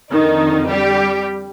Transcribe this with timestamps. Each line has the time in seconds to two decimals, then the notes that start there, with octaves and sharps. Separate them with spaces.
0.11 F2 D3 D#3 D#4
0.69 G3 G4